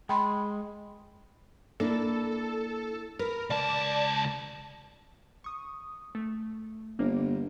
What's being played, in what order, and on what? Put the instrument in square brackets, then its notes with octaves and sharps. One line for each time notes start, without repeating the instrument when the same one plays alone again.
[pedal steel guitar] G#3 [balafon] G5 B5 C6
[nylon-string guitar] A#3 D4 E4 [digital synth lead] A4
[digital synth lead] A#4 [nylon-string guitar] B4
[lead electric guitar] C#2 A5 [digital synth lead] D5
[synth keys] C#6 D#6
A3
[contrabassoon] G1 [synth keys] A#3